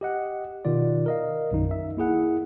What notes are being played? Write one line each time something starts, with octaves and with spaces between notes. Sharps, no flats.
G4 D#5 F#5
B2 D#3 F4 D5
A#4 D#5 F5
B1 F#2 D#3 D#4
E5
A#3 E4 G#4 F#5